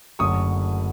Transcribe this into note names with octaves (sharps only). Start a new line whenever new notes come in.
F#1 F#2 D3 F#3 A3 C#6 D#6